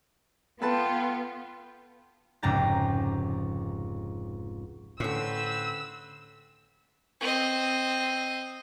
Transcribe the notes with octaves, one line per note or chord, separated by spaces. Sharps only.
B3 F4 A4 B4 G5 A5
F1 C#2 G#2 G4 A#5 A6
A2 D3 C4 C#4 B4 E6
C4 D#5